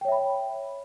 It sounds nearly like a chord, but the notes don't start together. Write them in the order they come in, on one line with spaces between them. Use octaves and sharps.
G5 C#5 E5 B5